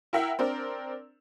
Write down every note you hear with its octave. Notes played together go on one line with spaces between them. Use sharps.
E4 A#4 E5 F#5 G5
C4 D4 A#4